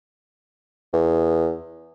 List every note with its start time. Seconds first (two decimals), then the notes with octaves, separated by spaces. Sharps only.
0.93 E2